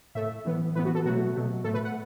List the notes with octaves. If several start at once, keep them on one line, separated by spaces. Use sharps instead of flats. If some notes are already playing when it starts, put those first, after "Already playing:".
A2 A3 E5
A2 E3 B3
A2 E3 B3 B4
F#4
A4
B2 F#3 A3 F#4
B2 F#3 A3
A2 A3 A4
B4
F#5